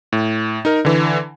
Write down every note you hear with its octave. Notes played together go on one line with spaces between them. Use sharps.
A2
D#4 A#4
D3 E3